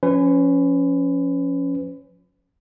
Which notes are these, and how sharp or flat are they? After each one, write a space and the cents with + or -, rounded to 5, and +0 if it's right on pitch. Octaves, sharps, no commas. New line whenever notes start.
F3 +25 C#4 +0 B4 +30